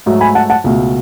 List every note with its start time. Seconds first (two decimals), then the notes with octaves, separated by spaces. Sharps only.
0.06 G#2 F#3 A3
0.21 G#5 B5
0.35 F#5 A5
0.50 F#5 A5
0.64 C#2 B2 A3